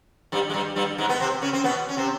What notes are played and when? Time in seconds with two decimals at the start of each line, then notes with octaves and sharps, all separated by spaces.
0.32 G2 G3
0.50 G#3
0.54 G2 G3
0.76 G2 G3
0.98 G#2 G#3
1.09 B3
1.20 C3 C4
1.42 C#3 C#4
1.53 C4
1.64 B2 B3
1.89 C#4
1.97 C3 C4